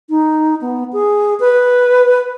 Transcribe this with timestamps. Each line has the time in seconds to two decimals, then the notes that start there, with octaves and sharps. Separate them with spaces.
0.10 D#4
0.61 B3
0.93 G#4
1.40 B4